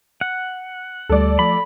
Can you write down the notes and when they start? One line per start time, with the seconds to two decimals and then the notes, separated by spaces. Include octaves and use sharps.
0.21 F#5
1.10 D2 G3 A3 A4 D5
1.39 F3 A3 B5